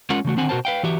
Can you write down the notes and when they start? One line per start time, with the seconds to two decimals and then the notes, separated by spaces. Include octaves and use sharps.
0.10 G#3 C#4 F4 A#4 F#5
0.25 C#3 E3 A3 F#4
0.37 D3 D#3 C4 F#5 G#5
0.49 B2 F#4 A#4 C5 A5
0.65 B4 F5 G5
0.83 E3 F#4 G4 E5